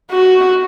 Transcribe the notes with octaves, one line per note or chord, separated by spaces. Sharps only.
F#4